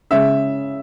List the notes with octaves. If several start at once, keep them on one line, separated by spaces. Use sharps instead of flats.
C#3 G#3 C#4 E5